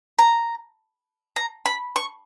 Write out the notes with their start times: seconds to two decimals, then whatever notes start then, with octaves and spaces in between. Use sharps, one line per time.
0.19 A#5
1.36 A#5
1.66 B5
1.96 C#6